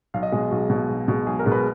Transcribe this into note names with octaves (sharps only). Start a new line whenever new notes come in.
B1 F5
D#5
B2 G#3 G#4
B1 F#4
B2 G#3
B1
B2 G#3
B1 G#4
A#4
B2 G#3
B4